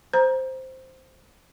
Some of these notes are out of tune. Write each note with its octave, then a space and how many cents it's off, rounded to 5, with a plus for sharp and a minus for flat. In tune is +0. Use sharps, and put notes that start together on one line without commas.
C5 +0 A#5 +20